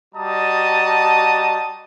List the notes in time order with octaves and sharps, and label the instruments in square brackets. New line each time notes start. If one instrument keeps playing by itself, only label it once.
[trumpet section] G3 F#4 D#5 A5 A#5 D#6